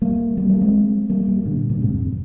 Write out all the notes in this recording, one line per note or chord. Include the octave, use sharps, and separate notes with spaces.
G3 A#3
G3 A#3
G3 A#3
G#3 C4
G3 A#3
G3 A#3
A#2 D3
A#2 D3
G#2 C3
F2